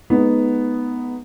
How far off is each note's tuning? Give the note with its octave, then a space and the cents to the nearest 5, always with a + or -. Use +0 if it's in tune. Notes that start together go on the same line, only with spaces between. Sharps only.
G#3 +40 B3 +0 D#4 +0